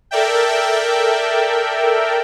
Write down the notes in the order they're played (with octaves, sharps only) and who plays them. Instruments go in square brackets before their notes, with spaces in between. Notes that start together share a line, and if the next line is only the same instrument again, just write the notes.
[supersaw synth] A4 A#4 D5 E5 G5